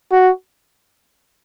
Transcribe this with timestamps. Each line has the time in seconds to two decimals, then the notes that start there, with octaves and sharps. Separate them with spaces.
0.12 F#4